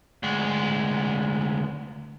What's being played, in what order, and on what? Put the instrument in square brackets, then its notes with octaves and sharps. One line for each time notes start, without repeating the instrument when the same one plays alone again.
[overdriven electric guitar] D2 G#3